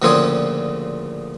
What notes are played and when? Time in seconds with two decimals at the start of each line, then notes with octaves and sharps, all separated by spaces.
0.02 D2 A#2 C#3 F3 C4 G#4